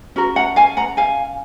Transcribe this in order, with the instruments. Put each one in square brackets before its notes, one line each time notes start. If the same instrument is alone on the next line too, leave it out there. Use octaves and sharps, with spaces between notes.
[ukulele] C#4 F#4 A#4
F#5 A#5
F5 G#5
F#5 A#5
F5 G#5